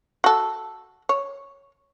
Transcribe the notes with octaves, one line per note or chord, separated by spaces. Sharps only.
F#4 A4
C#5